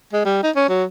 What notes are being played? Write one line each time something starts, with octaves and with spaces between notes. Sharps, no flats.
G#3
G3
D#4
C#4
F#3